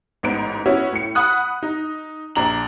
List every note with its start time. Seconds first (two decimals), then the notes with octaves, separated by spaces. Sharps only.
0.23 A1 G#2 B3 D7
0.66 B3 C#4 E4 F#4
0.92 A2 C#7
1.15 F#5 B5 D#6 F#6
1.63 D#4
2.35 A#1 D4 A#5 F#7